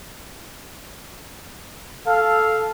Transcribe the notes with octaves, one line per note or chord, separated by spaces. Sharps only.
A4 F5